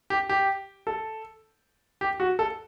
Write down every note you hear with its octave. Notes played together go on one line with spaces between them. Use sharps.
G4
G4
A4
G4
F#4
A4